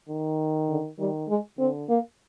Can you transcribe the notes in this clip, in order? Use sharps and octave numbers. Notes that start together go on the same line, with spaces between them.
D#3
D3
D#3 G3
G#3
D3 C4
A#3